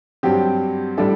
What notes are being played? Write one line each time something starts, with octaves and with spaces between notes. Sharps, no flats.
G2 F#3 C4 G4
A2 G3 D4 A4